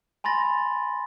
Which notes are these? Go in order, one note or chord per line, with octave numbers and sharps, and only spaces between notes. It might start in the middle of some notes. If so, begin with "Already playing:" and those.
G#5 B5 C6 A6 A#6